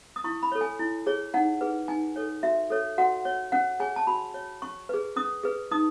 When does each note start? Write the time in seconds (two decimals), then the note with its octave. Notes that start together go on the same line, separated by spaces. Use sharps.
0.16 D#6
0.24 E4 C#6
0.43 B5
0.52 A4 C#5
0.61 G#5
0.79 E4
1.07 G#4 C#5
1.34 D#4 F#5
1.61 G#4 B4
1.88 D#4 G#5
2.16 A4 C#5
2.43 F#4 E5
2.70 A4 C#5
2.98 F#4 F#5
3.25 C#5
3.52 C#4 F#5
3.80 G#4 C#5 G#5
3.96 A5
4.07 F#4 B5
4.34 C#5
4.62 C#4 C#6
4.89 G#4 B4
5.16 C#4 D#6
5.43 G#4 B4
5.71 D#4 D#6